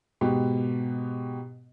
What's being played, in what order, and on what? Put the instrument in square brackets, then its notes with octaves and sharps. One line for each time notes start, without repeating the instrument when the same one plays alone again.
[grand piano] G#2 B2 B3 G4